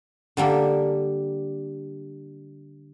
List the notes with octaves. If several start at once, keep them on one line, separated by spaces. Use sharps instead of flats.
D3 G3 A#3 A4